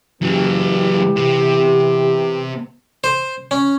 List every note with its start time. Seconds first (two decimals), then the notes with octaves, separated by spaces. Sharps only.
0.22 C#3 E3 F#3 B3 G4
1.17 C3
3.04 C5
3.51 C#4